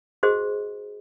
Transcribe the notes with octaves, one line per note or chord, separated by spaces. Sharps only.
F#4 G#4 C5 D#5